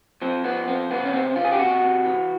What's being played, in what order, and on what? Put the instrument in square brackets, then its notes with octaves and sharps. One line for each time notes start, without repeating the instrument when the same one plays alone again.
[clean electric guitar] F3 C4
F3 B3
F2 C4
C#3 B3
C#4
C#3 C4
C#3 F4
G#4
G4
C3 F#4
C3
E3